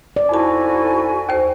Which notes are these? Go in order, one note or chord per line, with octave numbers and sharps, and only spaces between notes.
D5
F2 C4 D#4 E4 F#4 A4 G#5 A5
D#2 C5